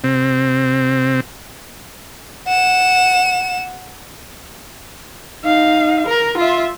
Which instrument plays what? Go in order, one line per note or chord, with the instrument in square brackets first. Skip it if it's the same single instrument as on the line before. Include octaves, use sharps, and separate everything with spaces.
[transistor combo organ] C3 C4
[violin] F#5 E7
[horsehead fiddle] D#4 F5
A#4
F4 E5